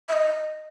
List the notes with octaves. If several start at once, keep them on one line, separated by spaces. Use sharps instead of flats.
E5
D#5